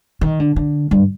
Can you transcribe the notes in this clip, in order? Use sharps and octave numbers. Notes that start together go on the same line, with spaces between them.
D#3
D3
D3
G2